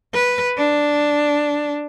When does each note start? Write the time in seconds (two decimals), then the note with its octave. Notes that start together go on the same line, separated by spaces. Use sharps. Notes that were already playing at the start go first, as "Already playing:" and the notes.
0.13 B4
0.57 D4